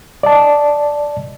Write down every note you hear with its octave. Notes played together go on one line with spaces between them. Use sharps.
D5 D#5 A5